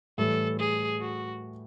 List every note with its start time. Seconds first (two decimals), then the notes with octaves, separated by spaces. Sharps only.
0.18 A2 E3 G3 A4
0.59 G#4
1.01 F#4